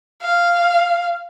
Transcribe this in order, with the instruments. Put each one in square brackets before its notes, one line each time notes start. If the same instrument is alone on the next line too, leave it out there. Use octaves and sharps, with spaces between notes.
[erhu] F5